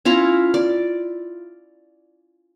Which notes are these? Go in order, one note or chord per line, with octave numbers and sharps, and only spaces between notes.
C#4 E4 F4 A#5
D5